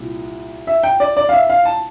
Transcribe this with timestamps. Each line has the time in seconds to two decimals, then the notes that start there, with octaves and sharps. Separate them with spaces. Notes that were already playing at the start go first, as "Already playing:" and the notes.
Already playing: C2 A#2
0.67 E5
0.83 G5
1.00 D5
1.17 D5
1.29 F5
1.33 E5
1.50 F5
1.65 A5